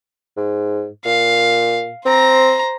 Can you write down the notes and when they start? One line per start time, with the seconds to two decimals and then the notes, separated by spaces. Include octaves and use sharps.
0.37 G#2
1.05 A#2 F5
2.06 C4 C5 A#5